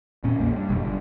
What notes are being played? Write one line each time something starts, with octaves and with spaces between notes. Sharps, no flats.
E1 A#2 C4 C#4
A#1 E2 A#3
G2
F#1 E2 B2 F#3
G1 G2